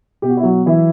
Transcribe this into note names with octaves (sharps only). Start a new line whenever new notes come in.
B2 G4
F#4
E4
F#3 F#4
E3 F#3 E4